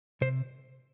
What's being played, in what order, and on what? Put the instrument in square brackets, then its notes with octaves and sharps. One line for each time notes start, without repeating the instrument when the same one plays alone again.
[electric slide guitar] C3 C5